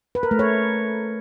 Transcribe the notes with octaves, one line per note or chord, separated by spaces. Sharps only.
B4
A#4
A3
C#5